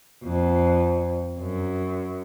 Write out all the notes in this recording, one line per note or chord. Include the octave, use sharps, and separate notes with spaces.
F2
F#2